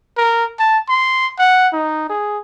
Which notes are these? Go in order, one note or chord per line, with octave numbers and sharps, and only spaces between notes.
A#4
A5
C6
F#5
D#4
G#4